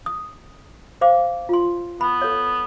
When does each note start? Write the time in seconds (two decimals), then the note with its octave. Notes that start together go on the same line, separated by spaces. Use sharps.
0.06 D#6
1.01 C5 F5 D6
1.49 F4 C6
2.01 B3 B5
2.22 A4 C#5